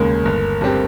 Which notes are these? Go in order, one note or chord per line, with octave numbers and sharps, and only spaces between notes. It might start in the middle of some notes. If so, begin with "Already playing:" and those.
Already playing: F1 D#2 C#3 G#3 A#4
G1
G2 G3 C4 G4